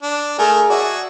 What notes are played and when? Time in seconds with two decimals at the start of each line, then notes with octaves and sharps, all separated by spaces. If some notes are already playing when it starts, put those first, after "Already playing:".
0.03 D4
0.38 A3 G#4 A#4
0.70 F#4 G#4 D5 E5 A5